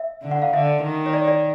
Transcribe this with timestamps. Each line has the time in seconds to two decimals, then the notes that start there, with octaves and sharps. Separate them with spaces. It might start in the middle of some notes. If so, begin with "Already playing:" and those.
Already playing: E5
0.23 D3
0.31 F#5
0.42 F5
0.53 D3 E5
0.83 D#3
1.06 C#5
1.13 D5
1.28 D5